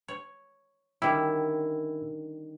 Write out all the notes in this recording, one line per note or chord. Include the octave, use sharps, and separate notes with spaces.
C#5
D3 D#3 G3 C#4 E4